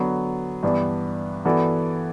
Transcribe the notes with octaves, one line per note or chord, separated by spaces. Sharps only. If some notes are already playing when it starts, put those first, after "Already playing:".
Already playing: D3 F#3 B3
G2 E3 B3 D4
E3 B3 F#4 A4 D5